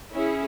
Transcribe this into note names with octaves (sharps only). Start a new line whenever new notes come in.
C#4 E4 G#4